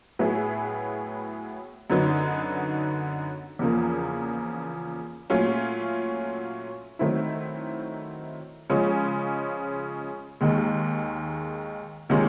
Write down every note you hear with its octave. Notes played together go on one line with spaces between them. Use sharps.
A2 F#3 B3 E4 G#4
F#2 D3 F#3 B3 D#4
E2 C#3 F3 A#3
A#2 F#3 A3 C#4 F4
D#3 F#3 A3 C4 E4
C#3 F3 G#3 C#4 F4
D#2 D#3 G#3
C3 D#3 G#3 C#4 F4